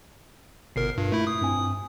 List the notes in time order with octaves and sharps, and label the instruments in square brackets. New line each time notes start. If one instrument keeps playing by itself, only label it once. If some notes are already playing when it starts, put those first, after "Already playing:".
[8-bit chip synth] G1 A#4 [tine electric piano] B2 C7
[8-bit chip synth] G2 [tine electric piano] F4
[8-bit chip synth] A3 E4
D#6
[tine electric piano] G2 C4 G#5